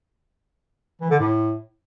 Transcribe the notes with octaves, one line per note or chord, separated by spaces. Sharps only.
E3
D3
A2